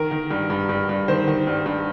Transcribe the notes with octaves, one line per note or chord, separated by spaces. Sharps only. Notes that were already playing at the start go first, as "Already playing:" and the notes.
Already playing: D#3 A#4
D#3
G2
G2
G2
G2
D#3 C5
D#3
G2
G2